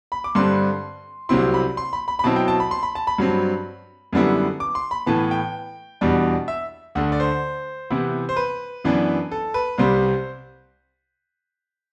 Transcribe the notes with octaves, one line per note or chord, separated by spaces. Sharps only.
B5
D6
G2 D3 G3 C4 C6
C2 C3 F#3 C4 E4 C6
B5
C6
B5
B5
B5
B2 F#3 C4 E4 A5
G5
A5
B5
C6
B5
A5
B5
G2 F#3 C4
F#2 D3 G3 B3 E4
D6
C6
B5
A2 E3 B3 A5
G5
E2 B2 G3 D4
E5
D2 D3 A3 F#5
D5
C5
C3 E3 B3 E4
C5
B4
F#2 E3 B3 D4
A4
B4
C2 C3 G3 C5